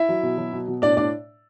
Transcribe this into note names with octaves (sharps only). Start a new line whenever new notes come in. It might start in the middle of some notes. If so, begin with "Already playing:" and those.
Already playing: E4 E5
F#3
B2
F#3
B2
B2
A2 D4 D5
A2 D4 D5